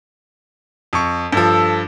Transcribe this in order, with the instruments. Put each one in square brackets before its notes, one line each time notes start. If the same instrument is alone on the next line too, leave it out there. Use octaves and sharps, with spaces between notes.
[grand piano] F2 C#6
[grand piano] G2 F3 [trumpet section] A4